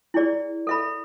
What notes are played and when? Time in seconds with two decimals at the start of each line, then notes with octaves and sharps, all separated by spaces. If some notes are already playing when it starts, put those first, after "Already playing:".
0.14 E4 G#4 D5
0.67 A4 E5 B5